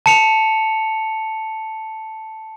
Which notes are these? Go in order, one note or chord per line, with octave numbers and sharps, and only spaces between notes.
A5 C#7 F7